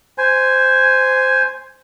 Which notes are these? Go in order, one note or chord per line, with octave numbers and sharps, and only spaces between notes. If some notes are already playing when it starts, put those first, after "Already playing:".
C5 G#5